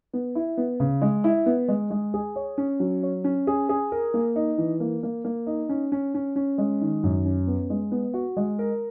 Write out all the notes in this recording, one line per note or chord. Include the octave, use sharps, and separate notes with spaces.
B3
E4
B3
C#3
G#3
E4
B3
G#3
G#3
G#4
C#5
C#4
F#3
C#5
C#4
G#4
G#4
A#4
A#3
D#4
E3
A#3
A#3
A#3
D#4
C#4
C#4
C#4
C#4
G#3
D#3
F#2
C#4
B3
G#3
B3
F#4
G#3
A#4